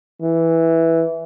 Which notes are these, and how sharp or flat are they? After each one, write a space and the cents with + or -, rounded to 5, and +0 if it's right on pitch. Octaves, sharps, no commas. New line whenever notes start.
E3 -5